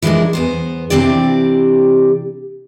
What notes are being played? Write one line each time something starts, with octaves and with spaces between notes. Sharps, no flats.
E3 F3 G#3 D4 E4 A#4
E2 B3 C5
C3 E3 C4 D4 G4 D5